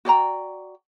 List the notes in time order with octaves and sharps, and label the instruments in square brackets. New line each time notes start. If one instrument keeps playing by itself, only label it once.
[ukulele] F#4 D5 G5 A#5